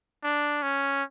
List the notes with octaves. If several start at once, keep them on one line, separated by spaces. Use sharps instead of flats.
D4
C#4